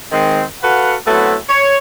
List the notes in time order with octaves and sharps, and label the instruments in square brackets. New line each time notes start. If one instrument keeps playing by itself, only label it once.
[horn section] D#3 G#3 C4
F#4 A4 B4 F5 F#5
F#3 A3 B3 C4 E4 F#4
C#5